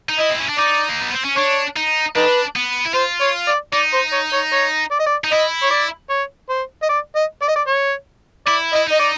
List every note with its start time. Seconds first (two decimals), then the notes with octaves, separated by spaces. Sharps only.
0.09 D#4
0.18 E4 D#5
0.30 C4
0.40 C#4
0.49 D4
0.58 D#4 D5
0.89 A#3
1.02 B3
1.13 C4
1.25 C#4
1.37 D4 C#5
1.77 D#4
2.16 D4 D#4 B4
2.56 B3
2.85 E4
2.94 F4 C5
3.21 C#5
3.48 D5
3.73 D#4 D5
3.94 C5
4.13 C#5
4.33 C#5
4.53 C#5
4.91 D5
5.00 D#5
5.06 D5
5.24 D#4
5.32 E4 D#5
5.63 C#5
5.71 D5
6.10 C#5
6.50 C5
6.83 D#5
6.89 D5
7.16 D#5
7.42 D5
7.48 D#5
7.56 D5
7.68 C#5
8.47 E4 D5
8.73 E4 D#5
8.87 D#4
8.92 D#5
9.00 D5